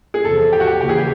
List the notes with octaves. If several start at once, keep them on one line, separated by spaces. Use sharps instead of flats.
G#4
E2 C3 F3 A4
G4
F#4
G4
D#2 C#3 E3 G4
G#4
G4